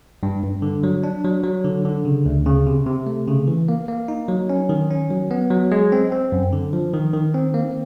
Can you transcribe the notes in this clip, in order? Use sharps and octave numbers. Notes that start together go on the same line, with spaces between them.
G2
G2
D3
F#3
D4
F#3
F#3
D3
D3
C#3
D2
C#3
C3
C3
A3
C#3
E3
A#3
A#3
D#4
F#3
C#4
D#3
C#4
F#3
B3
F#3
G#3
C4
C4
F#2
D3
F3
D#3
D#3
C4
A#3